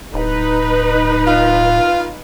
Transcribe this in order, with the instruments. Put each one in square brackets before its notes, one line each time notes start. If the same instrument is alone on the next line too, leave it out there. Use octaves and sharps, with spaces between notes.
[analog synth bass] D1 [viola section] D#4 B4
[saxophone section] F4